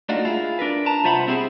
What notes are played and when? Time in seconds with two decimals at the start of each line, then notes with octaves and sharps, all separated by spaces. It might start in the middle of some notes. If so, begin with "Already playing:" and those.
0.09 A3 A#3 D4 D#4 F4 F#4
0.25 E4 F4 G#4
0.59 D4 A#4 B4
0.86 A5 A#5
1.04 C2 F4 C5 E5 F#5 B5
1.27 C4 E4 G4 G#4 C5